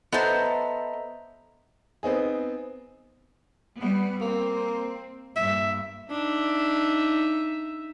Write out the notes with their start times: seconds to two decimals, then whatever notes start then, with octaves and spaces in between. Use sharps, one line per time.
0.12 B3 A4 C5 D#5 E5 A#5
2.03 B3 C4 D#4 G#4
3.78 G3 B3
4.21 A#3 C4
5.36 G2 A#2 E5
6.10 D4 D#4 E5